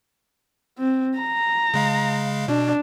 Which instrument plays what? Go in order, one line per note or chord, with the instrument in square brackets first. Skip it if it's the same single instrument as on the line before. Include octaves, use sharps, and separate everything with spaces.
[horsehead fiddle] C4
A#5
[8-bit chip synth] C#3 G#3 F5
[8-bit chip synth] B2 [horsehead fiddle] D4